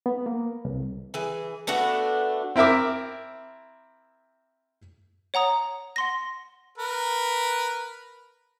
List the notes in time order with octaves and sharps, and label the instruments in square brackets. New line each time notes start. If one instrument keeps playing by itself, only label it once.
[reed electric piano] B3
A#3
C2
[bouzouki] E3 G#4
A3 B3 D4 F#4
[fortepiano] C4 E4 A#4 E5 D6
[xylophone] C#5 F#5 A#5 D#6
F#5 C6 A#6
[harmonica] A#4 B4